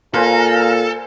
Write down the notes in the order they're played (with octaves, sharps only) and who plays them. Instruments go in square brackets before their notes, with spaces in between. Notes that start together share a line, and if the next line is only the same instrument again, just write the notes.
[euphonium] A#2 [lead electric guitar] A4 [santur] B4 C5 G#5 [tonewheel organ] F5 A#5